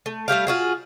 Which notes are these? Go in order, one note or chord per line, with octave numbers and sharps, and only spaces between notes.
A3
G3 A3 G4 F5
F4 F#4 G#4